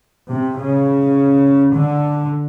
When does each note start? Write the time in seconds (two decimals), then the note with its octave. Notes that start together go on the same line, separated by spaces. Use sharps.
0.31 C3
0.59 C#3
1.74 D3